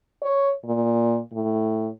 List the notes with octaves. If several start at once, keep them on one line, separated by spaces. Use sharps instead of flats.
C#5
A#2
A2